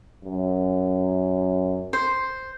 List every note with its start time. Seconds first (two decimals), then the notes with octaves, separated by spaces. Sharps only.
0.24 F#2
1.93 C5